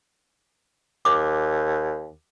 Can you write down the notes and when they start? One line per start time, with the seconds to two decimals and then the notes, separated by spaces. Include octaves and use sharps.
1.05 D#2 D6